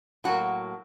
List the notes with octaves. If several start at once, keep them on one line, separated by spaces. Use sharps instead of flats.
A2 F#3 A#3 F#4